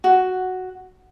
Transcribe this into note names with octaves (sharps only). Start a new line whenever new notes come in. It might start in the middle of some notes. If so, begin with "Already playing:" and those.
F#4